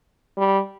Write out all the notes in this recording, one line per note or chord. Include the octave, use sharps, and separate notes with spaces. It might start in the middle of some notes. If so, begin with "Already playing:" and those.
G3